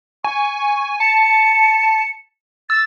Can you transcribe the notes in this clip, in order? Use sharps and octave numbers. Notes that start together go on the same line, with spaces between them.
G#5 C#6
A5 C#7
E6 A6